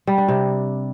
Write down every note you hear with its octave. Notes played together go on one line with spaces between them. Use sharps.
G3
D4
C3